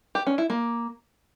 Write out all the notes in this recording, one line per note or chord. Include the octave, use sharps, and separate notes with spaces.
G4
C#4
E4
A#3